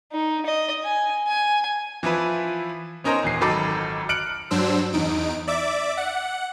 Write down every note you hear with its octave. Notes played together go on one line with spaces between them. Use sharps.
D#4
D#5
G#5
G#5
E3 F3 E4 B4
B3 C#4 D#4 A#4 C5 A#5
D#1 E3 C7
G#1 D#3 F#3 A4 B5 D6
F6 F#6 C#7 D7 F#7
G2 F#3 D4 C5 E6
E2 D#4 D7
D5 E5 D6
F#5